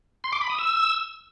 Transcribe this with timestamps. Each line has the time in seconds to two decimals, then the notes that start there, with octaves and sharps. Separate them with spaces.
0.24 C6
0.33 D6
0.41 B5
0.50 D#6
0.58 E6